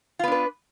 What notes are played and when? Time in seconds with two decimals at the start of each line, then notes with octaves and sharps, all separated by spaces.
0.19 F4
0.24 B3
0.28 D4
0.32 B4